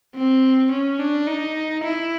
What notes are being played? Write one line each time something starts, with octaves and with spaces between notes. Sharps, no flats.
C4
C#4
D4
D#4
E4